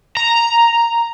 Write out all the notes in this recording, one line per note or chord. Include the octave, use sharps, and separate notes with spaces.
A#5